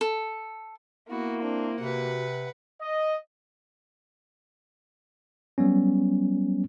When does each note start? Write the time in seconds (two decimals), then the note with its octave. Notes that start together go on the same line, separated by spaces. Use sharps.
0.01 A4
1.10 A#3 B3 E4 F#4
1.42 C4 D4
1.80 C3 F#4 B4 F#5
2.81 D#5
5.58 F#3 G3 B3 C#4